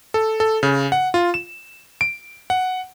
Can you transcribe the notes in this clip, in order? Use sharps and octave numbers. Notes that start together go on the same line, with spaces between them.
A4
A4
C#3
F#5
F4
E7
D7
F#5